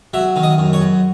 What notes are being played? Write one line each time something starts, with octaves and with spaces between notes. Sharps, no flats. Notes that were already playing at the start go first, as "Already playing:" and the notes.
F#3 E5
D#3
D#5
F#2
C#5
F#2